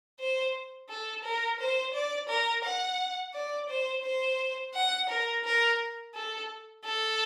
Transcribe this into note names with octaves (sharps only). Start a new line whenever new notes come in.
C5
A4
A#4
C5
D5
A#4
F#5
D5
C5
C5
F#5
A#4
A#4
A4
A4